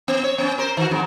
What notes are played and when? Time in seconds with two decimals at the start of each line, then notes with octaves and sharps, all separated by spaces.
0.08 B3
0.24 C#5
0.38 B3 C#4
0.58 A#4 C5
0.77 D#3 F#4
0.91 F2 G#2